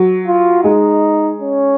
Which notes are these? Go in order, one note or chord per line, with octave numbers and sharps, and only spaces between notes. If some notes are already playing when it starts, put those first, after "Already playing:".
Already playing: F#3
F4
G#3 D#4
C#4